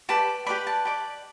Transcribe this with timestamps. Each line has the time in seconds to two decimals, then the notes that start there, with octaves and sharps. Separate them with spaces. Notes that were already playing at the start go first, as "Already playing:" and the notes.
0.09 G4 B4 D5 A5
0.46 G4 B4 D5 B5
0.67 A5
0.85 G4 B4 D5